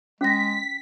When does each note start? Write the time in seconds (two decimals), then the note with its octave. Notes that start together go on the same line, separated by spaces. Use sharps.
0.21 G#3 C#4 G5 A#6 B6